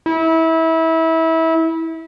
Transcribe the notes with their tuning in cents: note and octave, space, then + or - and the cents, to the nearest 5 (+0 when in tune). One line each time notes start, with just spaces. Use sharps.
E4 -25